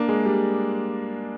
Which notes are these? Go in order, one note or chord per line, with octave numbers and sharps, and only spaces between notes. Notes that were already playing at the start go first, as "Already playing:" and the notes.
Already playing: A#3 D4
G#3
G3